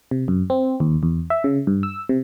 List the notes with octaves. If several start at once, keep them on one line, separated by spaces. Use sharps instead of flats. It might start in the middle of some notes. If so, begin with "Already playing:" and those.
C3
F#2
C4
D#2
E2
E5
C#3
G2
E6
C3